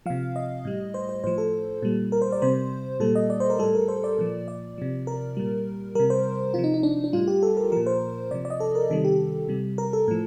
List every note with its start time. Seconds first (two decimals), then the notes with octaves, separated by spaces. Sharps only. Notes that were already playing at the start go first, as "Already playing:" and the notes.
0.06 C3 F3 F5
0.36 D#5
0.65 A2 G3
0.94 C5
1.09 C5
1.24 A2 F3 C5
1.38 A4
1.82 A#2 G3
2.12 A#4
2.22 C5
2.32 D5
2.42 C3 G3 C5
3.00 A#2 G3 A4
3.15 D#5
3.30 D5
3.40 C5
3.50 A#4
3.59 A2 G3 A4
3.75 A#4
3.88 C5
4.04 D5
4.18 A#2 F3
4.48 D5
4.78 C3 F3
5.07 A#4
5.37 A#2 G3
5.95 C3 G3 A#4
6.10 C5
6.54 C3 F3 F4
6.64 D#4
6.74 D#4
6.83 D4
7.04 D4
7.13 A2 G3 F4
7.28 G4
7.43 A4
7.57 A#4
7.72 A#2 F3 A#4
7.86 C5
8.31 C3 F3 D5
8.45 D5
8.50 D#5
8.60 A4
8.75 A#4
8.90 C3 D#3 G3 A4
9.05 G4
9.49 C3 G3
9.78 A#4
9.93 A4
10.08 A2 F3